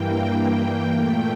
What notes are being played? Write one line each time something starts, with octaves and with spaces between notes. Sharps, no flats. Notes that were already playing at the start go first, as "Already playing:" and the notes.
Already playing: G2 E3 A#3 G5
G2 E3 A#3
A#2 A3